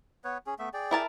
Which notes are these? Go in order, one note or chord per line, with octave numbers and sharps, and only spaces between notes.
B3 B4 C#5
C#4 G#4
A3 B3 E5
G#4 D5 G5
E4 A#4 A5